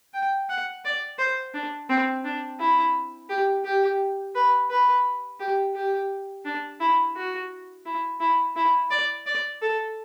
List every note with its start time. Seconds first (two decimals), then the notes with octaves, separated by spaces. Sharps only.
0.14 G5
0.49 F#5
0.85 D5
1.19 C5
1.54 D4
1.89 C4
2.24 D4
2.60 E4
3.29 G4
3.65 G4
4.35 B4
4.70 B4
5.40 G4
5.75 G4
6.45 D4
6.80 E4
7.16 F#4
7.86 E4
8.20 E4
8.56 E4
8.90 D5
9.26 D5
9.61 A4